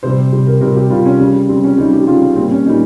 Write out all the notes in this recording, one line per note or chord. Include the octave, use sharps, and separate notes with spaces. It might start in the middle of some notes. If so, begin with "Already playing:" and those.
C3 G3 C5
C3 G3
A#4
C3 G3 A#4
G4
C3 G3 F4
C#4
C#3 G3
C#3 G3 C4
C#4
C#3 G3 D#4
G4
C#3 G3 F4
C#4
A#2 G3 C4
C#4
A#2 G3 D#4